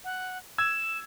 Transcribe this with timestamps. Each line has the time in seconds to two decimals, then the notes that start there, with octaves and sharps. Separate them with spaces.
0.04 F#5
0.58 E6 G#6 E7